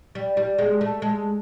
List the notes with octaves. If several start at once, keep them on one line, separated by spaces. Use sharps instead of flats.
G3
G3
G#3
A3
G#3